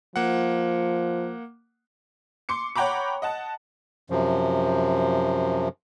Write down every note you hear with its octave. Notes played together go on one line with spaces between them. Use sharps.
F3 A#3 F#5
C6 D6 C#7
C#5 F#5 G5 A#5 B5 D6
D#5 F#5 A5
F#2 C3 F3